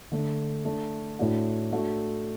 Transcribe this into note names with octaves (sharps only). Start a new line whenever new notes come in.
D3 A3 D4
A3 D4 A4
A2 A3 D4 F#4
A3 D4 F#4 A4